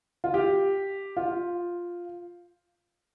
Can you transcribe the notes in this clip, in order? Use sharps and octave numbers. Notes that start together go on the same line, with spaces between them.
F4
G4
F4